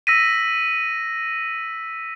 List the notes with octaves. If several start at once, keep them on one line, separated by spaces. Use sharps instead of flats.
E6 A#6 B6 D#7